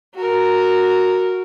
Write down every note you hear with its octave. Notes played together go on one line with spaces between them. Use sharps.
F#4 A#4